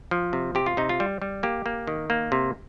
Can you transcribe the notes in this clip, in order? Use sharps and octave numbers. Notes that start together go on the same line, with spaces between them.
F3
C3
C3 G4
F4
C3 D#4
F4
G3
G3
A#3 G4
A#3
D#3
A#3
C3